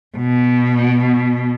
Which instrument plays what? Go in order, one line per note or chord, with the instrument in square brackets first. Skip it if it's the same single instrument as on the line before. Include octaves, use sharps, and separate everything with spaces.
[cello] B2